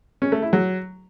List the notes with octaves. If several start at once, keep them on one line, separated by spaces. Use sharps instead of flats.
C#4
A3
E4
F#3